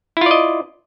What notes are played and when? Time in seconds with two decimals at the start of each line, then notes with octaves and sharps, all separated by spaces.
0.17 E4
0.21 F4
0.26 D5
0.31 D#5